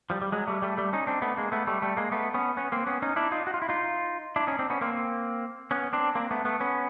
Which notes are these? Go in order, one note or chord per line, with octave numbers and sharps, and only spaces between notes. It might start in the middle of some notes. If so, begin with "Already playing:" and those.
F3 G3
G3
F#3 G#3
G3 A3
G3 A3
G3 A3
C#4 D#4
C4 D4
A3 B3
G#3 A#3
A3 B3
G3 A3
G3 A3
G#3 A#3
A3 B3
B3 C#4
B3 C#4
A#3 C4
B3 C#4
C#4 D#4
D4 E4
D#4 F4
F#4
F4
E4
D#4 F4
D4 E4
C#4 D#4
C4 D4
B3 C#4
A#3 C4
B3 C#4
C4 D4
A#3 C4
A3 B3
A3 B3
B3 C#4